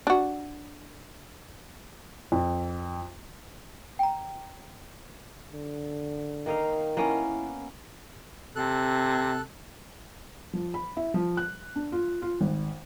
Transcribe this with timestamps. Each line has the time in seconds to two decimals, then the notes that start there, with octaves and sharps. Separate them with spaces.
0.07 D4 F#4
2.32 F2
3.99 G5 A#5
5.52 D3
6.46 D#3 A#3 D#4 F5
6.97 A#3 B3 C#4 E4
8.56 C3 A4 F#6
10.53 F3
10.74 B5
10.97 E4
11.14 F3
11.37 F#6
11.76 D4
11.92 F4
12.22 F4
12.41 G#1